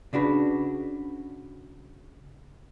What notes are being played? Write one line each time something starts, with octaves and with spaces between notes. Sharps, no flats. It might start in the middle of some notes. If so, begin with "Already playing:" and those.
C#3 D4 F#4 B4